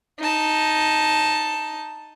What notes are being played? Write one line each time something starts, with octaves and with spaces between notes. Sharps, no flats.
D#4 A5